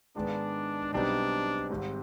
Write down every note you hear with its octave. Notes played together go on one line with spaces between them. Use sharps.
G#2 D#3 G#3 B3 D4
B1 B2 G3 C4 D4 D#4
G#1 G#2 G3 C4